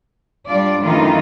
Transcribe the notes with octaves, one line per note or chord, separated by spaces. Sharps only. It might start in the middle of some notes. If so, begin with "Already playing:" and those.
G3 D4 F4 D5
F#2 D#3 E3 A3 D#4 F4